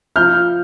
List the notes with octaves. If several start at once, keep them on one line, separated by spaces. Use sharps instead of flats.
F3 F6 G6